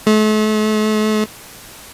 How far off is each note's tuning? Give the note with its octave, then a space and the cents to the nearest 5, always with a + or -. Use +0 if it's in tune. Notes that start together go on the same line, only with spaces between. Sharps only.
A3 -40